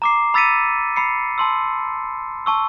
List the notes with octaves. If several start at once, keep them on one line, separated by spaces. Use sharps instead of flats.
A#5 D6 C7
B5 E6 A6 B6 C#7 D#7
B5 C7 C#7
A5 C6 E6
A5 C#6 E6